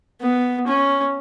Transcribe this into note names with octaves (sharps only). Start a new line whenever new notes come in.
B3
C#4